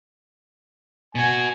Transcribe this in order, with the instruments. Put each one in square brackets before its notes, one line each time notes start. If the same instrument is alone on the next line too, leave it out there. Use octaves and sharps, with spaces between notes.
[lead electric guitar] B2 F#4 [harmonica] G#5